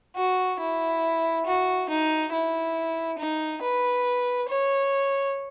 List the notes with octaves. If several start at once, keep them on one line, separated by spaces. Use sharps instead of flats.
F#4
E4
F#4
D#4
E4
D#4
B4
C#5